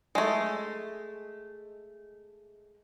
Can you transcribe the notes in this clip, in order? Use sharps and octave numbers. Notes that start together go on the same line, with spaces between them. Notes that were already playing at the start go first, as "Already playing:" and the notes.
G#3 A3